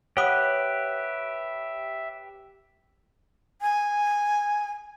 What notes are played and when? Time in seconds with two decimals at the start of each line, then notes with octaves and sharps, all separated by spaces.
0.17 G4 B4 C#5 E5 F#5 D#6
3.61 G#5